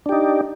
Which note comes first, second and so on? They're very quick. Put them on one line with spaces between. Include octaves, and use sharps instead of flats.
D4 G4 D#4